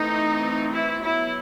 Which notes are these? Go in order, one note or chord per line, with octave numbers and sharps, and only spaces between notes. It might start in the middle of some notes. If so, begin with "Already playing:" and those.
Already playing: E3 A3 C4 D#4
E4
F#3 B3 E4